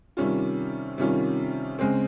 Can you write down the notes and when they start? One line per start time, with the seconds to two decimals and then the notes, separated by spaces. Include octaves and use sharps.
0.17 C3 D#3 G3 C#4 F4
0.98 C3 D#3 G3 C#4 F4
1.79 C#3 G#3 C4